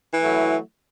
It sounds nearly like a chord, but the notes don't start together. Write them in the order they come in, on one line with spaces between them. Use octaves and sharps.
E3 E4 A3 F#3